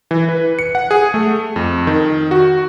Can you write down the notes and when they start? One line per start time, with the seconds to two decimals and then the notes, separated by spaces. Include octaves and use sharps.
0.11 E3
0.29 B4
0.59 C#7
0.75 F#5
0.91 G#4
1.14 A3
1.56 F2
1.87 D#3
2.31 F#4